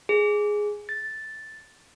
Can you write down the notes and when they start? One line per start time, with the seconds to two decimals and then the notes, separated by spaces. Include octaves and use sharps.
0.09 G#4
0.89 A6